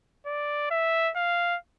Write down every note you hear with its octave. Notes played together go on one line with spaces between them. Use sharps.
D5
E5
F5